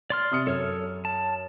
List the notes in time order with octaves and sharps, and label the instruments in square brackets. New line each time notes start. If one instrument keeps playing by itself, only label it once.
[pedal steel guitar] D5 C6 F6
[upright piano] C3 D#6 C#7
[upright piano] F#2 [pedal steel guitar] A4 C#5 F6
[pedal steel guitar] A5